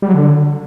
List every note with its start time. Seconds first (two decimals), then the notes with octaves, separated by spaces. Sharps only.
0.02 G3
0.08 F#3
0.14 D3